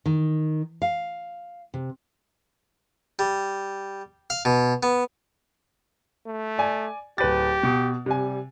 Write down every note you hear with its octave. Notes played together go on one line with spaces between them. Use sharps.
D#3
F5
C3
G3
F5
B2
B3
A3
D5 G#5
D1 G4 B4 A6
B2
C3 G3 G#5